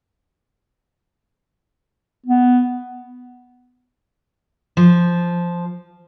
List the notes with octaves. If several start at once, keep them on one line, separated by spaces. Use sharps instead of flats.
B3
F3